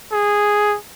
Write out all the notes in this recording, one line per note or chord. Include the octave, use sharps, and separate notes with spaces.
G#4